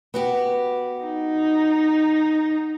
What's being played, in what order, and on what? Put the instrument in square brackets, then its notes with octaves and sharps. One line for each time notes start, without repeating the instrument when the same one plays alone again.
[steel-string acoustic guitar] B3 F#4 G4
[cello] D#4